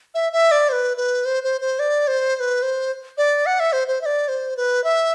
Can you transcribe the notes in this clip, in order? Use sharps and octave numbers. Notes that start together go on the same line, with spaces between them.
E5
E5
D5
C5
B4
B4
C5
C5
C5
D5
C5
C5
B4
C5
D5
F#5
E5
C5
C5
E5
D5
C5
B4
E5